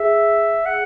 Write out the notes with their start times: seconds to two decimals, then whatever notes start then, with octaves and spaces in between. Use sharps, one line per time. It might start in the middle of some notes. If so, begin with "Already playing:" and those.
Already playing: G#4 E5
0.65 F#5